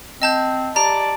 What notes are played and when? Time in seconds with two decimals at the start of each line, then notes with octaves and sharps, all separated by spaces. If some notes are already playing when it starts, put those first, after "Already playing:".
0.22 C4 D#5 A5 G6
0.76 G4 D5 A5 A#5